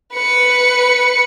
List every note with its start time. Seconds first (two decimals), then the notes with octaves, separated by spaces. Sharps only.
0.15 B4 C#7